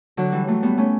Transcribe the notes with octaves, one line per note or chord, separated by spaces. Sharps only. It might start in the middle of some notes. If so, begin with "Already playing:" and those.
D3 F#3
E3 G3
F#3 A3
G3 B3
A3 C#4